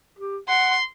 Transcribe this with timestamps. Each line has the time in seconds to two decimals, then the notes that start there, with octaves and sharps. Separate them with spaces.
0.19 G4
0.49 F#5 C6